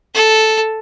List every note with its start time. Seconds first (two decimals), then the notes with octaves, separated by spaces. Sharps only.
0.14 A4